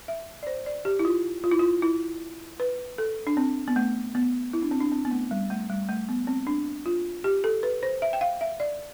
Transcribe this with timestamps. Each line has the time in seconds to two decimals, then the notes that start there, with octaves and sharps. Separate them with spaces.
0.08 E5
0.43 D5
0.47 C5
0.66 D5
0.85 G4
0.99 E4
1.05 F4
1.44 F4
1.51 E4
1.59 F4
1.82 E4
2.60 B4
2.98 A4
3.27 D4
3.37 C4
3.68 B3
3.76 A3
4.15 B3
4.53 E4
4.62 D4
4.71 C4
4.80 D4
4.92 C4
5.05 B3
5.11 A3
5.31 G3
5.50 A3
5.70 G3
5.89 A3
6.09 B3
6.27 C4
6.47 D4
6.86 F4
7.24 G4
7.44 A4
7.63 B4
7.83 C5
8.02 E5
8.13 G5
8.21 F5
8.41 E5
8.60 D5